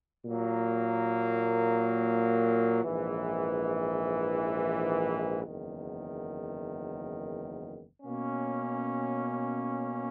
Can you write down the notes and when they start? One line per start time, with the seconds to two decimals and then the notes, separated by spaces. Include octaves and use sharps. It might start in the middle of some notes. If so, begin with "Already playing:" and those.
0.25 A#2 F#3 A#3
2.84 A#1 G#2 E3
5.44 F#1 E2 D#3
8.02 B2 A#3 C#4